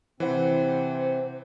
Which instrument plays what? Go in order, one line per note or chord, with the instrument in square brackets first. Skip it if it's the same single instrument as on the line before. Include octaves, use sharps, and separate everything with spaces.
[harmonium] C3 C4 [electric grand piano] E3 B4 F#5 [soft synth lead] C5